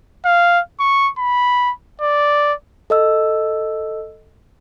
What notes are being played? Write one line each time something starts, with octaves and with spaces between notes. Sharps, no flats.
F5
C#6
B5
D5
A4 D#5 E6